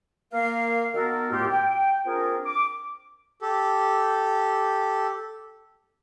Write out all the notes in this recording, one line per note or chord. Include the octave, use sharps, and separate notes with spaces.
A#3 A#4 F5
D#3 B3 F#4 A4 A#4
D#2 A2 A3 F4 G4
G5
C4 D4 F4 G#4 A#4
D6
G4 A4